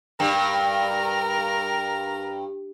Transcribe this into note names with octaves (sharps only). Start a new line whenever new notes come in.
G2 A#4